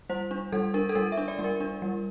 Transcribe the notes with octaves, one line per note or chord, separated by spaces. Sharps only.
G3 C5
D4
G3 A4
D4 A#4
A4
G3 A#4
E5
D4
D5
G3
A#4
D4
G3